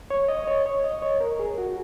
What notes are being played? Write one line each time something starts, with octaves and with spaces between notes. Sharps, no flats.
C#5
D#5
C#5
C#5
D#5
C#5
A#4
G#4
F#4